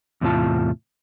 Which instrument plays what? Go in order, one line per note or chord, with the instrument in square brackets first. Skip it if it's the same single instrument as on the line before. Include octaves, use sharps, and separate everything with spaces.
[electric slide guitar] E2 A2 C3 D4 F4 A5